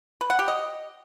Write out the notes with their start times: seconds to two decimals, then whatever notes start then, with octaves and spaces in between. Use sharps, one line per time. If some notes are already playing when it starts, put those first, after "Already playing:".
0.21 B4
0.30 F#5
0.39 G4
0.48 D#5